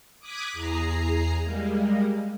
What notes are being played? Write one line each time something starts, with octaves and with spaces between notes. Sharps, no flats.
D6 D#6 F#6 G#6 B6
E2 G#4 A#5 C7
G3 G#3 A#3